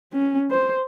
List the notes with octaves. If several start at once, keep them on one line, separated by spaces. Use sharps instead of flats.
C#4
C5